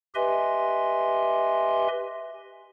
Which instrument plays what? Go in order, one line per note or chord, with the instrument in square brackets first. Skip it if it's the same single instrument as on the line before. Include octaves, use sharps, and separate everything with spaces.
[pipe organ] G4 B4 D#5 E5 G#5 C6